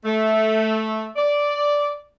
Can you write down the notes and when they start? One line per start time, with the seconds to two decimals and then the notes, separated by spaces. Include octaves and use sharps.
0.05 A3
1.16 D5